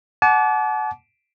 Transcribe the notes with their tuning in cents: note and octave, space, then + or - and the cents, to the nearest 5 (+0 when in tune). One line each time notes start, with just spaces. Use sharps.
F#5 +0 A5 -40 D6 -20